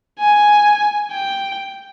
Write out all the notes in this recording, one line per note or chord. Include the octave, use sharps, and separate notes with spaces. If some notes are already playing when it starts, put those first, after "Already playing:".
G#5
G5